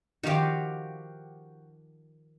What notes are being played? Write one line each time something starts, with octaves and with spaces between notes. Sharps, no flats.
D#3 F3 F#4 G4 F5